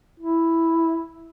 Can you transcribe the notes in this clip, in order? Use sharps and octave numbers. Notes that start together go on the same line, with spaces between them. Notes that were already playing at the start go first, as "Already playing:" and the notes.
E4